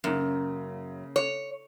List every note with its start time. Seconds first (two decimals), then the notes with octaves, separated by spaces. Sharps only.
0.04 F#2 C#3 A#3
1.16 C#5